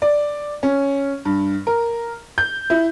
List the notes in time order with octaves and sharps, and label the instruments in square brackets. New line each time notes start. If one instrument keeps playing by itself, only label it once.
[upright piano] D5
C#4
G2
A#4
G6
E4